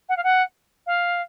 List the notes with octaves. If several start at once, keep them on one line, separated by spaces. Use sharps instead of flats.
F#5
F5
F#5
F5